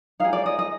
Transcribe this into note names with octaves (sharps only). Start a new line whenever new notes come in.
D#4 G#4 F5
D5
D#5
D#5